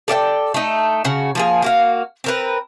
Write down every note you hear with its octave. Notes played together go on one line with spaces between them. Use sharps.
A4 D5 E5 G5
A3 D#4
C#3 F#4
F3 A#3 G#4
A#3 F#4 F5
C4 A#4 B4